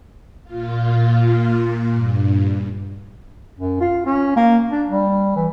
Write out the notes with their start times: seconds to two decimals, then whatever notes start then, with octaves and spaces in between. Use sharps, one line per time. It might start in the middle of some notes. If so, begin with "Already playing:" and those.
0.44 A#2 F4
1.57 A#2
1.92 G2
3.59 F#2
3.81 F4
4.06 C#4
4.36 A#3
4.71 D4
4.89 G3
5.36 E3